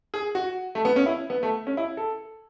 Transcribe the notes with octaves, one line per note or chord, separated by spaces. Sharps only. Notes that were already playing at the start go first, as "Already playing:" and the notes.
G#4
F#4
A3
B3
C#4
E4
B3
A3
C#4
E4
A4